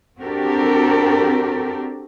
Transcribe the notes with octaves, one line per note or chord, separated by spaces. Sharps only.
C4 D4 F#4 G4 A4 A#4